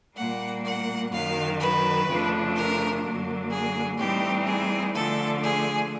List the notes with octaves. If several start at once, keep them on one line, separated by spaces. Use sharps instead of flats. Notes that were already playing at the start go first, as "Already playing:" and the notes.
A#2 G3 A#3 F#5
F#5
F#2 D#3 F#3 F5
B4
F2 C#3 F3 A3 D4
A#4
F#2 D3 F#3 A#3
G#4
A2 E3 G3 C4 D#4 G4
G#4
D3 F3 A3 A4
G#4